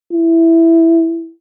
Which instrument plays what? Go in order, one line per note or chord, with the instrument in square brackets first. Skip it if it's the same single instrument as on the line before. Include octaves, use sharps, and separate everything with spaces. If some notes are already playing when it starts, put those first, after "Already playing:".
[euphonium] E4